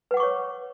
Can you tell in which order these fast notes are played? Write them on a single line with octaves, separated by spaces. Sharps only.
B4 F#5 D6 C#6 C#5